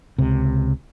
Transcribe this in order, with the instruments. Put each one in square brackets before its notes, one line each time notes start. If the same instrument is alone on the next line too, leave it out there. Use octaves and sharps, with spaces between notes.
[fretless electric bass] C#2 C3